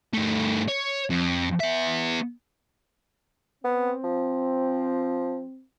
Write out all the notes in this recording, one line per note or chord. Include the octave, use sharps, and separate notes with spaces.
G2 A3
C#5
F2
B3 E5
B3 C4
F3